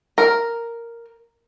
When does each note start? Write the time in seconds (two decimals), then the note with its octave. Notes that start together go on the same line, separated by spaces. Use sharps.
0.18 A#4